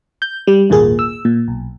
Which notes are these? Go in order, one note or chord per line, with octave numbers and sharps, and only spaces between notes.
G6
G3
G#1 D#2 A#2 A#3 G#4
E6
A#2
B1